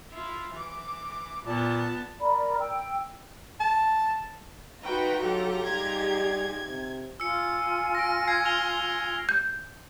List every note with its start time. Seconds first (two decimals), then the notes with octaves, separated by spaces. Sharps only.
0.12 E4 F4
0.54 E3 D6
1.45 A#2 B3 A5
2.20 A#4 D5 A#5 B5
2.60 G5 E6
3.60 A5
4.83 D#4 F4 F#4 B4 G5 A#5
5.23 F#3 G4 A4
5.65 G3 D#4 G4 G#4 G#6
6.65 C3
7.20 F4 G#5 E6 C#7
7.95 A#6 D7
8.28 G#6 A#6 C7
8.45 F6 F7 G7
9.29 G6